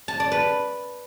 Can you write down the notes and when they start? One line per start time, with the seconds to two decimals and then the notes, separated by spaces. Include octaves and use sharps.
0.08 A5
0.20 D5
0.32 B4